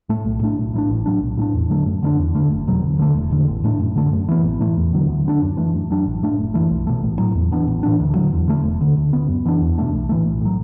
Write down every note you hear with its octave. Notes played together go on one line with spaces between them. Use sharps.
A2 A3
B1
A2 A3 D4
B1
A2 F#3 D4
A1
A2 F#3 D4
B1
A2 A3 D4
E2
D3 F#3 A3
F#2
D3 A3 D4
E2
D3 A3
F#1
E2 B2 F#3
D2
D3 A3
E1
E2 D3
A1
A2 A3 D4
F#2
D3 A3
F#2
E3 B3
A1
A2 E3 A3
E2
D3 F#3
D2
D3 B3 D4
F#2
E3 A3 D4
F#2
F#3 D4
A1
A2 A3 D4
F#1
F#2 E3 A3
B1
B2 A3
A1
A2 F#3
E2
E3 B3 D4
A1
A2 E3 D4
D2
D3 F#3
E2
D3 A3
E1
D2 D3
D2
D3 B3
F#2
E3 B3 D4
E2
B2 A3 D4
B1
A2 E3 A3
B1
A2 F#3